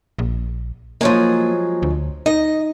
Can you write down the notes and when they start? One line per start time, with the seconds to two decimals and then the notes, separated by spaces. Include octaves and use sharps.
0.19 A#1
1.01 F3 F#3 G#3 A#3
1.82 D2
2.26 D#4 D#5